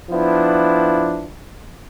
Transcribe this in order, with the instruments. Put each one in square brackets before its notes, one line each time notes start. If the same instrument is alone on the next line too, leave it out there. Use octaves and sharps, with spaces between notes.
[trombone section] F3 B3 D4 E4